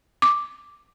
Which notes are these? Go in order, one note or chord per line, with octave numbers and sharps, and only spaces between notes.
D6